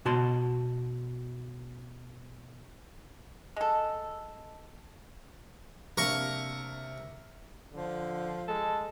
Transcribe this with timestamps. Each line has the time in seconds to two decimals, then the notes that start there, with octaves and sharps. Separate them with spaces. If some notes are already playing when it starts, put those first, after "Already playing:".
0.05 B2 F#4 A5 C6
3.56 G#3 A4
5.97 C3 A#3 D4 A#4 C#6
7.73 D3 F3
8.48 G#3 A4